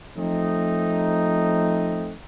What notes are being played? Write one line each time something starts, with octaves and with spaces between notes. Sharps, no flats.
F3 A3 C4 D#4